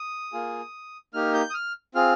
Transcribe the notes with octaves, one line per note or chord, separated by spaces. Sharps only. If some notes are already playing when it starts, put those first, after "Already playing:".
Already playing: D#6
A#3 F4 G#4
A#3 D#4 G4 F6
G6
D#6
F6
C4 F4 G#4 F6